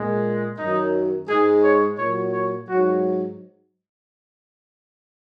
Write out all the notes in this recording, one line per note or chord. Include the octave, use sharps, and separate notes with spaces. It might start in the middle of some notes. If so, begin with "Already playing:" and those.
Already playing: A#2 G#3
F#2 D#3 F#3 D#4
G#2 G#3 G#4
C#5
A#2 F#3 C#5
C#5
G#2 F#3 F#4